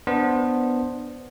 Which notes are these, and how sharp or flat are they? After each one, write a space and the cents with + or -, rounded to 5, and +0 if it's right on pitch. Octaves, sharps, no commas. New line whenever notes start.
B3 +0 D4 +0 C5 +0